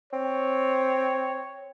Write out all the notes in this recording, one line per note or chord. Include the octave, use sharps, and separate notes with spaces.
C4 C#5